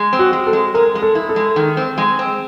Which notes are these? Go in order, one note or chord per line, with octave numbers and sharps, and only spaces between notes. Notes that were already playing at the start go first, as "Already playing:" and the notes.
Already playing: G#3
C4
F#4
G#3
A4
G#3
G#3 A#4
G#3
A4
E4
A4
G#3
D#3
C4
G#3
C4